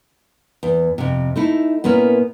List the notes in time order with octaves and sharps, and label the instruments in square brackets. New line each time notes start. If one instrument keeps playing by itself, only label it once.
[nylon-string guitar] E2
F2 C3
A3 D#4 E4
A#2 B3 C#4 E4 A#4